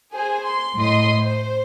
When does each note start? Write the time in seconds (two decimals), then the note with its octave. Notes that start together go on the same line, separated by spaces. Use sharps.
0.12 G#4 C5 G#5
0.42 C6
0.76 A2 D#5 C6 D#6
1.17 C5